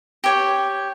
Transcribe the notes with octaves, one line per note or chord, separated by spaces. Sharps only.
G4 C#5